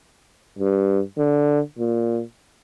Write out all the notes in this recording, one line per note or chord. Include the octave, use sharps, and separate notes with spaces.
G2
D3
A#2